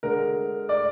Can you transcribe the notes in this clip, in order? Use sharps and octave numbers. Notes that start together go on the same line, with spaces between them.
D3 G#3 A#4
D5